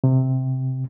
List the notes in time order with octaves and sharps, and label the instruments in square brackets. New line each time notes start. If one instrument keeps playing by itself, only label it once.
[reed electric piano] C3